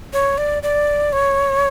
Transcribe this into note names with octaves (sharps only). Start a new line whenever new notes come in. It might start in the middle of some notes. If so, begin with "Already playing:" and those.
C#5
D5
D5
C#5